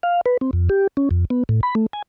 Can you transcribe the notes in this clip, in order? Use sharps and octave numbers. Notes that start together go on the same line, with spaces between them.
F5
B4
C4
F2
G4
C#4
F2
B3
A2
B5
A3
G#5